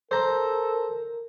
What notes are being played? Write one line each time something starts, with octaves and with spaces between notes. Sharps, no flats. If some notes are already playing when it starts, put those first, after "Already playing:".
A4 A#4 C5 A#5